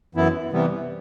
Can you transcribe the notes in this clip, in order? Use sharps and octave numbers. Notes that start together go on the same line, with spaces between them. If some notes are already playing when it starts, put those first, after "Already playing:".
F#2 E3 B3 E4
C3 E3 G3 B3